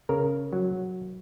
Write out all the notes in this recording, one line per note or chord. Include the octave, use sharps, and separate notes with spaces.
C#3 A#4
F#3